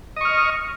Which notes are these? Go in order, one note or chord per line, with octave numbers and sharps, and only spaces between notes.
D#5 C#6 F6